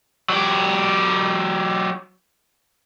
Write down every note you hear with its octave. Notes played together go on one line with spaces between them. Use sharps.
F#3 G4